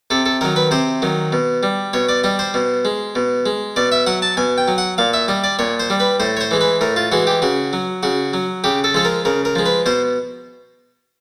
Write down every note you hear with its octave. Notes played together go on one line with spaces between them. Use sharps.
C3 A4
A4
D#3 F#3 A#4
B4
C3 C5
D#3 F#3
B2
G3
B2 C#5
D5
G3 D#5
C5
B2
G#3
B2
G#3
B2 D5
E5
F#3 F#5
A5
B2 G#5
G5
F#3
F#5
A#2 F5
E5
G3 D#5
D5
A#2 C#5
C5
G3
B4
A2 C5
C#5
C5
E3 G#3
B4
A2 A#4
F4
E3 G#3 F#4
G4
C#3 F#4
F#3
C#3 F#4
F#3
C#3 G4
A4
F3 G#3 A4
A#4
C#3 A#4
A#4
F3 G#3
B4
B2 C5